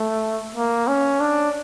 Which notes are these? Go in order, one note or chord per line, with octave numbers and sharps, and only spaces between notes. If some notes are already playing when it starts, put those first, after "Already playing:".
Already playing: A3
A#3
C#4
D4